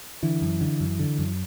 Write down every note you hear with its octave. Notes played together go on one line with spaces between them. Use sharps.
D3 E3
F#2
D3
F#2
D3
F#2